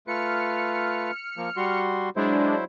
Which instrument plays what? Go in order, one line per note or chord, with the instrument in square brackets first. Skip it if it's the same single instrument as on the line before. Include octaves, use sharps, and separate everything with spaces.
[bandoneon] A3 F4 B4 [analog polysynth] F6 C#7
[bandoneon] F3 A#3
G3 F#4 C6
[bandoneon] F#3 E4 C5 [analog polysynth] G#3 D4